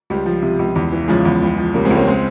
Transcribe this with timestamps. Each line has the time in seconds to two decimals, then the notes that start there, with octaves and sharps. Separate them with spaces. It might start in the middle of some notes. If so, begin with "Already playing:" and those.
0.10 C#2 G3
0.26 F3
0.42 C3
0.59 C#2
0.76 E2
0.92 E3
1.08 C#3 F3 G#3
1.25 E2
1.42 C#2
1.58 F3
1.74 C#3 G3 A#3
1.85 G#3 C4
1.90 C#2
1.96 A#3 C#4
2.07 G#3 C4